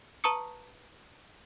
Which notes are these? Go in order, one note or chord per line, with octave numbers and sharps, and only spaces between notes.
B4 A5 A#5 C#6 D#6 C#7